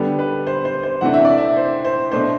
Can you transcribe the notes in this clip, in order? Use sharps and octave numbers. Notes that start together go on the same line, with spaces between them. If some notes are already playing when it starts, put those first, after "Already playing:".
Already playing: D3 G3 B3 D4
B4
C5
C5
C5
C3 E3 A3 D4 F#5
E5
D5
E5
C5
C5
B2 A3 D4 C5